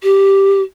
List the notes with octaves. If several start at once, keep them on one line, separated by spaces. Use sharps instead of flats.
G4